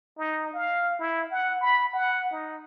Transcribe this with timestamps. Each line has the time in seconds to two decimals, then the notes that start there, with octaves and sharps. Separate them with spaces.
0.18 D#4
0.54 F5
0.99 E4
1.31 F#5
1.61 B5
1.93 F#5
2.31 D#4